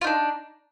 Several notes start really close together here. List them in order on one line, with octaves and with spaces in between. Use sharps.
F4 D#4 D4